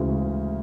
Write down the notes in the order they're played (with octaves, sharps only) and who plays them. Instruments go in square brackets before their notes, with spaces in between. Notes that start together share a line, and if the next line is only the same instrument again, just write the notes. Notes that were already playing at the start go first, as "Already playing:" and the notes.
Already playing: [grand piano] D2 C#3 E3 G#3